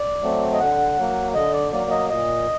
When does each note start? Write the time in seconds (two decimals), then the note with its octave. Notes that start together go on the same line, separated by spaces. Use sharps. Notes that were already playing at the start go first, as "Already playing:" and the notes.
Already playing: D5
0.22 F#3 A3 C4
0.53 D#5
0.60 D3 F#5
0.97 F#3 A#3
1.34 D3 D#5
1.53 D5
1.72 F#3 A#3 D5
1.91 D#5
2.10 A#2 D#5